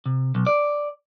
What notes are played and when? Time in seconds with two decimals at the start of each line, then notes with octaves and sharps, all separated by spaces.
0.06 C3
0.35 B1
0.47 D5